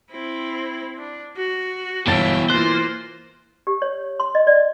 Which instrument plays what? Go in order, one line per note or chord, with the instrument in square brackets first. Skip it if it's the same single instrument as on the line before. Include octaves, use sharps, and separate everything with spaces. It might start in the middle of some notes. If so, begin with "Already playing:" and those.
[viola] C4 E4
D4
F#4
[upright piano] G1 A5 A6 [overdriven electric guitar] B2 E3 [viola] E5 G5
[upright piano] E3 F#6 [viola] A#3 F4 [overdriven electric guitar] C5
[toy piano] G4
C#5
C6
D#5
D5